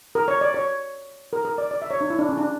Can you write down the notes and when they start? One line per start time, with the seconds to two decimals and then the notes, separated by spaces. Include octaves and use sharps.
0.15 A#4
0.28 C#5
0.41 D5
0.54 C#5
1.33 A#4
1.45 A#4
1.58 D5
1.71 D5
1.82 E5
1.91 C#5
2.01 D4
2.10 E4
2.19 D4
2.29 C#4
2.37 D4